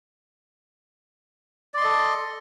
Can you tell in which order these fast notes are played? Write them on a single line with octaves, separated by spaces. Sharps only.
D5 C6 D#5 A4